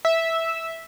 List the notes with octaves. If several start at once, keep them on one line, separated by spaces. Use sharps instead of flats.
E5